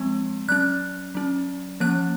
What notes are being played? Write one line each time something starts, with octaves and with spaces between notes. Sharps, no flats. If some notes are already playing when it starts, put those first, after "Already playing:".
Already playing: F3 G#3 C4
F#3 C#4 F#6
F#3 C#4
F3 A#3 C#4 F#6